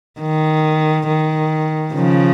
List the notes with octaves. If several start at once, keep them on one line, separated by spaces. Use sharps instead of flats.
D#3
D#3
C#3 F3